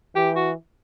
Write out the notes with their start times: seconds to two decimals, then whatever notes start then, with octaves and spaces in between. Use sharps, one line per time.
0.16 E3 G4
0.36 F#4